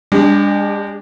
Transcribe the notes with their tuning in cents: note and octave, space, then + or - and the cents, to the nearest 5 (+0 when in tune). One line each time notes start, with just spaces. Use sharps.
G#3 -45 D4 -15 G4 +0